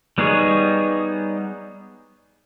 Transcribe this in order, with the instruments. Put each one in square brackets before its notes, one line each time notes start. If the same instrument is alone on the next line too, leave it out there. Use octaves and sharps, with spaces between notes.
[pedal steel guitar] G3 B3 D#4 G#4 C#5